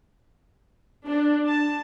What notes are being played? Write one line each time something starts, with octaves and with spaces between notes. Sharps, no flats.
D4
A5